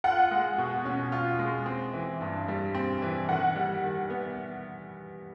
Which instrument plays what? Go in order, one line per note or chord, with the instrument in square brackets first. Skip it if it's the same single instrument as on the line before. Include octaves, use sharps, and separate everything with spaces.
[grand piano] F4 [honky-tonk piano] F#5
[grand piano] G#3
B2
C#4
F4
G#3
C4
E3
G2
G3
C4
E3
[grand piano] D#3 [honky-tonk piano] F#5
[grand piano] G3
D#3
B3